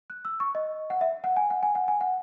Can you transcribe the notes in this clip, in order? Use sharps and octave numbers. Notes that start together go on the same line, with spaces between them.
F#6
E6
C#6
D#5
F#5
E5
F#5
G#5
F#5
G#5
F#5
G#5
F#5